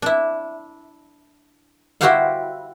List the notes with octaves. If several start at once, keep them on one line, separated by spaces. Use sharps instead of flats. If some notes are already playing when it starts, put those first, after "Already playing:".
D4 E4
E4 F#4 G4 C5 F5 F#5